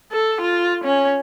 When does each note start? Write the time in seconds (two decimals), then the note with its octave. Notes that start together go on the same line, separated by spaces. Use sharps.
0.11 A4
0.41 F4
0.84 C#4